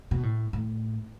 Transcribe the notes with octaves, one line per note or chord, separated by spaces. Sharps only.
B2
A2
A2